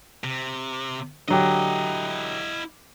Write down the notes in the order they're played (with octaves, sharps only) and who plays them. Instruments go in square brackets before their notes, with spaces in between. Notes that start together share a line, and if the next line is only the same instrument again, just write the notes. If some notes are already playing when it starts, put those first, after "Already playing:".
[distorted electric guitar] C3
[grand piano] D3 F#3 G4 [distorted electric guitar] E4 D#5